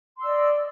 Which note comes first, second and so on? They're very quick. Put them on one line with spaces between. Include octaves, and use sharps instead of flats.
C6 E6 D5 D#5